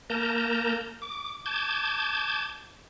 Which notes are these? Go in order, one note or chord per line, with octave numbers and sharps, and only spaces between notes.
A#3 A#4 A5 A#5 G6
D6
A5 D6 G6 G#6